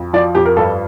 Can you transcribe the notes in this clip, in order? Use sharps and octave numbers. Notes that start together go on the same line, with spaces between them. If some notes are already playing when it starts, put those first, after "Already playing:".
Already playing: F2
F3 D5
F2 G4
A#4
G2 A4